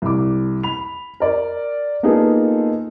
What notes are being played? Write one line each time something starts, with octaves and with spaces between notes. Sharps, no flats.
C2 D6
B5 F7
A#4 D5
A#3 B3 D#4 F4 G#4 A4